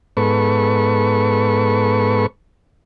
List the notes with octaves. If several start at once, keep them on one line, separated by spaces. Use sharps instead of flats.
G#2 B3 A4 B4 C#6